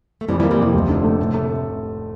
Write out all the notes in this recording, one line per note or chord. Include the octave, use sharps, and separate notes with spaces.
A3
F2 E3 G3
E3 G3
A#3
E3 G3
F2 C3
F1
D3
A3
A2
A3